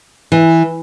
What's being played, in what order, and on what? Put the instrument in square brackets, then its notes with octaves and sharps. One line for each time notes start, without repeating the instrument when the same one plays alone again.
[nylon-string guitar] E3